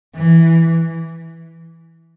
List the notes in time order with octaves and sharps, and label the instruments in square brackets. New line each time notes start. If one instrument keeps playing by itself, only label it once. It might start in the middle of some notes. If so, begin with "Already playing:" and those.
[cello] E3